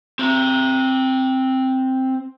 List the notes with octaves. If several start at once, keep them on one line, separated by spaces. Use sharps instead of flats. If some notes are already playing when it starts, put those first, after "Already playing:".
C4 A#5